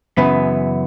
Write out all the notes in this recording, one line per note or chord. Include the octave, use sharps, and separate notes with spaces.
F#2 C#3 E3 B3